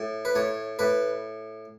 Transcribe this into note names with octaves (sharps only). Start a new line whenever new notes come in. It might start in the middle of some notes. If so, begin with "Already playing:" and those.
Already playing: A2
B4
A2 C#5
A2 B4